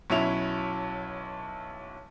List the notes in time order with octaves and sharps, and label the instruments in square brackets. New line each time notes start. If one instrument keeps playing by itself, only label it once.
[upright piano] B1 F#3 C#4 E4 E5 F7